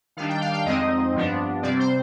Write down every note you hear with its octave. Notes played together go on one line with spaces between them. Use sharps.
D#3 G3 D4 F5
G5
F5
G5
F2 D3 G#3 C4 D#4 D#5
G2 F3 B3 D4
C3 G3 C4 D5
C5